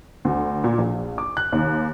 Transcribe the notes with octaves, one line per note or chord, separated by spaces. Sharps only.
D2
A#2
A#1
D6
F#6
D#2